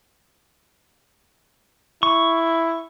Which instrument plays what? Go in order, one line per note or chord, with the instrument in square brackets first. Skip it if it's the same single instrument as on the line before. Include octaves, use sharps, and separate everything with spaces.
[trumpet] E4 [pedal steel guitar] C#6